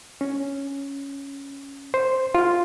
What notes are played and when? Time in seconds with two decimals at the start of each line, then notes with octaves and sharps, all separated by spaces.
0.21 C#4
1.94 C5
2.35 F4